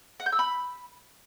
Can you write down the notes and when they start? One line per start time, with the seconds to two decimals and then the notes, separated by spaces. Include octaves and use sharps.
0.20 F#5
0.26 G6
0.32 E6
0.39 B5